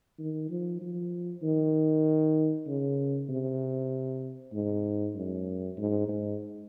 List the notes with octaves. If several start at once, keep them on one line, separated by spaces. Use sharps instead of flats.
D#3
F3
F3
D#3
C#3
C3
G#2
F#2
G#2
G#2